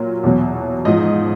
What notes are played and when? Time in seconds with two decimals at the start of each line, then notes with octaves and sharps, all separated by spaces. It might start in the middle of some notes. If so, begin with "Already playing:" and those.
Already playing: A#2 F#3
0.23 E2 B2 F#3
0.85 G#2 F3 D#5